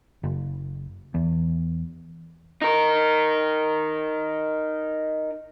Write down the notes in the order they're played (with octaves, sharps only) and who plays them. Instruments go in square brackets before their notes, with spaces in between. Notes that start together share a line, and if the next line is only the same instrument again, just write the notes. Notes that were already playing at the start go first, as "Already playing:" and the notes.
[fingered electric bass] F#1
E2
[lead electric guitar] D#4 A#4